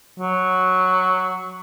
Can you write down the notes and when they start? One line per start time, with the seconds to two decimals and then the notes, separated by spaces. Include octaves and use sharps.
0.19 F#3